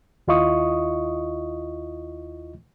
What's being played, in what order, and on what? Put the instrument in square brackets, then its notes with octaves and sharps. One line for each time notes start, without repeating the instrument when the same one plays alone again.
[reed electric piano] D#2 E4 F4 D#5 C#6 D#6